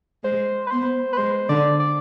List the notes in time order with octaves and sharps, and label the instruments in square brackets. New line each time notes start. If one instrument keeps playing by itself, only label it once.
[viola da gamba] G#3 [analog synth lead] C5
[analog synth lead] B4
[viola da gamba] B3 [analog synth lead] C5
[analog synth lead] B4
[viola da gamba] G#3 [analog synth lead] C5
[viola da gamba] D3 [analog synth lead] D5
[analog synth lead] D5